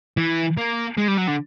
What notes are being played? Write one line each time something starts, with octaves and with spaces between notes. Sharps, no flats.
E3
A#3
G#3
G3
F#3
D3